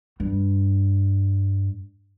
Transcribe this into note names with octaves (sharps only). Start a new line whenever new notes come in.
G2